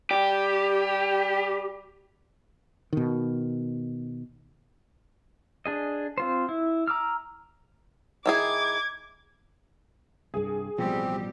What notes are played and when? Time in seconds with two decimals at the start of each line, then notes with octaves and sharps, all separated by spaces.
0.11 G3 G4
2.93 B2 D#3
5.66 D4 G#4 D#5
6.18 C4 F4 C5
6.49 E4
6.88 A#5 D6 E6 F6
8.26 D#3 E4 G#4 D6 G#6
10.34 C2 G2 G#4
10.78 A1 B2 F3 G3 C4 G4